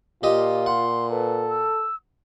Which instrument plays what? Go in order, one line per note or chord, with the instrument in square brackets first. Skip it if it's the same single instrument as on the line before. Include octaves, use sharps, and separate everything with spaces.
[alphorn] A#2 [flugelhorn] F4 [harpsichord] G4 D#5
[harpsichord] F#5 [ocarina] C6
[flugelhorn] A4 [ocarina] B4
[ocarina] E6